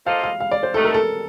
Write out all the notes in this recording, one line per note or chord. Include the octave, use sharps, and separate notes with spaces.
A#3 F4 A4 C5 D#5 F5
F5
F5
D5
C5
C3 D#3 A3 D4 A4
A#4
A4